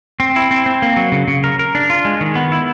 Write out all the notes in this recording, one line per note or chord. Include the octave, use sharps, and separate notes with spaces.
C4
E4
C4
C4
A#3
F#3
C#3
C#3
A#4
A#4
D4
F4
G#3
D#3
B3
E4